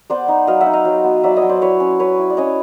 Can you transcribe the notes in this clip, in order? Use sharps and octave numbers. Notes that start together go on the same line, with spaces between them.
B3 C5 D5
D#4
F#3 D#5 F5
E5 F#5
D#4
D#5 F5
F#3
B3
F#3 D5 E5
C#5 D#5
F#3
C5 D5
E4 B4 C#5
C#4
C#4 B4 C#5
E4
D5
C#4 C#5 D#5